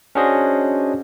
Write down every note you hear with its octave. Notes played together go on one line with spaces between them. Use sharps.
C#4 D4 F#4 G#4 C5 D#5